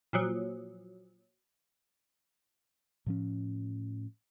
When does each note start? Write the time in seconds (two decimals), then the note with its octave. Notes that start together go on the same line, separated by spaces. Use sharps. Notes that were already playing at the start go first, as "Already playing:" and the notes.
0.13 A#2 F3 F#3
3.06 A2 F3 C#4